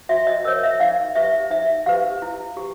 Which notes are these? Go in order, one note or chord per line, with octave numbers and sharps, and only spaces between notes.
F#4 E5
D#5
A#4 C#5 D#5
E5
D#4 F5
G4 B4 E5
D#4 E5
G4 B4 F5
E4
G4